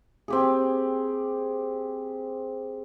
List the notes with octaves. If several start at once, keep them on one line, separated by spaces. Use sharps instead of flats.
C4 G4 G#4